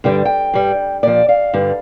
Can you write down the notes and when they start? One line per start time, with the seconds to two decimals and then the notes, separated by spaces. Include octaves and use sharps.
0.04 G2 D3 G3 G5
0.25 G5
0.54 G2 G3
1.03 A#2 F3 D5
1.29 F5
1.54 G2 D3 G3